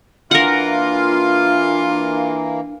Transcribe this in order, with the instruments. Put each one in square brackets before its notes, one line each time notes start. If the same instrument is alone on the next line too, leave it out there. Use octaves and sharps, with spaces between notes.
[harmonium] E3 A#3 [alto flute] D4 [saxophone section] F4 [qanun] A#4 F#5